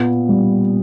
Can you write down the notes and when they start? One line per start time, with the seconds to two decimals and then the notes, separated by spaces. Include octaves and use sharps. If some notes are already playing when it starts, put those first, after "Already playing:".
Already playing: A#2 B3
0.29 G3